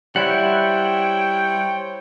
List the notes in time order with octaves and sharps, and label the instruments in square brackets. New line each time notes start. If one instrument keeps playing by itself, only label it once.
[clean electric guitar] G3 [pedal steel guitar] E4 F#5 [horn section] C5 C#5 G5